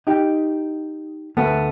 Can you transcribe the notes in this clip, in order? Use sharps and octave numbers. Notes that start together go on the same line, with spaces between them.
D#4 G4
D2 A3 B3